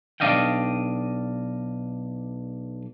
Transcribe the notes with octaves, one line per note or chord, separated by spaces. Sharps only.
B1 D4 D5 D#5 F5 G5